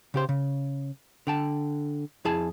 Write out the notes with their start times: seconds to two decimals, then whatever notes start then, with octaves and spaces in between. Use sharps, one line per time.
0.14 C#3 G4 C5
0.29 C#3
1.27 D3 G5 A5
2.25 F2 E4 G#4 G#5 A5